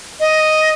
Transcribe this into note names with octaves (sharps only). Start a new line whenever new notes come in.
D#5